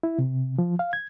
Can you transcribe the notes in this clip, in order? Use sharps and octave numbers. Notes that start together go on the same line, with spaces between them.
E4
C3
F3
F5
G#6